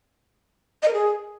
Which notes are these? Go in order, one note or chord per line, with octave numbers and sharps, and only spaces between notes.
D#5
A#4
G#4